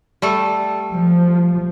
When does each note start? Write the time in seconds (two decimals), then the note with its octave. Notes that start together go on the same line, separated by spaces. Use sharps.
0.22 G3 A3 A4
0.92 F3